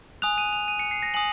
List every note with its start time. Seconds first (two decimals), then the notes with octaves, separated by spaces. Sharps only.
0.22 G#5 D#6 F#6 F7
0.38 D#7
0.53 F7
0.68 D#7
0.79 C#7
0.91 C7
1.03 A#6
1.14 G#5 D#6 F#7